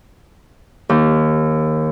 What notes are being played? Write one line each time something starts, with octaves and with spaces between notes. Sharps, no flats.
D#2